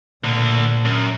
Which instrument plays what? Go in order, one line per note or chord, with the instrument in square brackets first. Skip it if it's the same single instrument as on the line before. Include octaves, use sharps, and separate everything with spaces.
[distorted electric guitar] D2 D3 [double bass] A#2
[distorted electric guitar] F#2